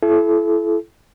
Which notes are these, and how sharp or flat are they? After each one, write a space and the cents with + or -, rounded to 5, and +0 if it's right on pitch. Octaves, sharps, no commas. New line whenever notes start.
E4 +30 A4 -35